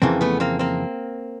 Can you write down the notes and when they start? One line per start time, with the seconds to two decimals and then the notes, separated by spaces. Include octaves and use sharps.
0.02 F2 C#3 E3 A#3 C4
0.21 A3 B3
0.40 A#3 C4
0.59 A#3 C4